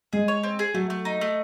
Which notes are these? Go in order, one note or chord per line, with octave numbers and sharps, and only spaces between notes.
G#3 G#4
C#5
C4
G#4
F#3 A3
A3
D#4
A3